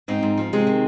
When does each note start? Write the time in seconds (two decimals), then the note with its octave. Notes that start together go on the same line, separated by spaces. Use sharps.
0.08 G#2 C4 D#4
0.23 G#2
0.37 F3
0.53 C3 G#3 C4
0.67 D#3